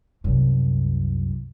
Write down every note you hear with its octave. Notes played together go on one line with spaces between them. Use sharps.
C2 F#2